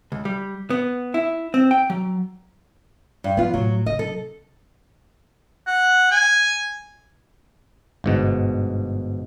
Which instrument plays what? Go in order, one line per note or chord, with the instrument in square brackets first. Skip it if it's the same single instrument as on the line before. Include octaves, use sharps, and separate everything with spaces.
[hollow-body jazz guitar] C#2
G3
B3
E4
C4
G5
F#3
[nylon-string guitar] G2
[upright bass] F3 [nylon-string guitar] B3 F4
[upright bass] A2 [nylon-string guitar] F#3
[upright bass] C#3 F#3 [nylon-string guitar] D#5
[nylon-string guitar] A4
[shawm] F#5
G#5
[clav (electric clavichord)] G1 G#2 B2